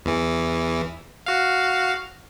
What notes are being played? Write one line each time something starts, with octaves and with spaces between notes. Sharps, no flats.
E2 E3
F#4 F5